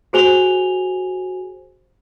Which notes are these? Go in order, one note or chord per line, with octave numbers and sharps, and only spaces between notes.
F#4 G#4 C5 G#5 F7 G7